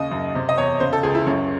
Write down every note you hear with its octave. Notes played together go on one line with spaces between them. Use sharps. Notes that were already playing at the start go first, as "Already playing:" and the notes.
Already playing: D#2 C#3 D#5
F#2
C3
D#5
E2 C#5
C#3 C5
A4
C#2 G#4
E4
F#2 C#4